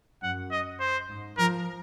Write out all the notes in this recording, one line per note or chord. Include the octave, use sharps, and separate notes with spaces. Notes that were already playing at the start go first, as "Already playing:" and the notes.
F#2 F#5
D#5
C5
G#2
F3 A#4